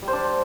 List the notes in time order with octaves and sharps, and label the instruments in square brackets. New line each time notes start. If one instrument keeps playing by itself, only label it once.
[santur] G3
C5
D4